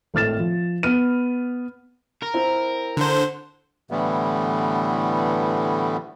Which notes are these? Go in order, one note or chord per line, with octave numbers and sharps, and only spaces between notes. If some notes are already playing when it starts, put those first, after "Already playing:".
G#1 A2 F6 A6 E7
F3
B3 F6 D#7
A#4
C4 E4
D3 C5
A2 D3 E3 G3 A3 B3